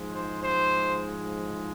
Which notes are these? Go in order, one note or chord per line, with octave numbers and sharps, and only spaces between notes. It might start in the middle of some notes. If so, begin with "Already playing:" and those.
Already playing: G#2 F3 G#3
C5
C5